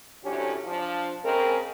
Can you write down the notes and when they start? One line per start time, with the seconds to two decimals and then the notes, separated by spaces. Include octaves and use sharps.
0.24 A2 C3 F#3 C#4 D4 G4
0.64 F3 D4
1.24 C#3 G#3 C4 G#4 A#4